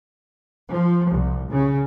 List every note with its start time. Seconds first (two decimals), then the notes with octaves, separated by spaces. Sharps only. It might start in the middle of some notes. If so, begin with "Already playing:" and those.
0.71 F3
1.11 C2
1.49 C#3